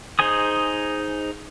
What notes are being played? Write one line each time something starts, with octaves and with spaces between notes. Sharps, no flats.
D#4 G#4 C5 G#5 D#6